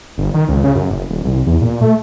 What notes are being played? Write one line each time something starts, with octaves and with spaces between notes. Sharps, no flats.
G1
D#3
C#2
C#3
F#2
F#1
D#1
C2
E2
A#2
A3